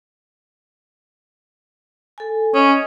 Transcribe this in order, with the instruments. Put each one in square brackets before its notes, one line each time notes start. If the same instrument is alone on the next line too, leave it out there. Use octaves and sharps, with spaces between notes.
[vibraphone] A4 G#5
[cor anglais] C#4 [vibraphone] D#5 D#6